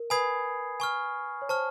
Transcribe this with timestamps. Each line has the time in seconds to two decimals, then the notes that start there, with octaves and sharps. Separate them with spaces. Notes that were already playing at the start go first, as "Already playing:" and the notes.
Already playing: A#4
0.10 B4 G#5 B5 D#6 G#6 C7
0.80 G#5 C#6 F6
1.42 C#5
1.49 C5 A5 C#6 F6